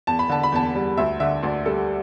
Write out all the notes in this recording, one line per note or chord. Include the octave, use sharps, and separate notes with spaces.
E2 A5
B5
D3 A5
B5
E2 A5
G3
D2 E5
D3 E5
D2 D5
G3 A4